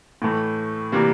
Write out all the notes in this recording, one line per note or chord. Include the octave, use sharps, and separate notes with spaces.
A2 E3 A3
C3 E3 G3 A#3